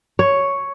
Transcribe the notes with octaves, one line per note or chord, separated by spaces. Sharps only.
C#5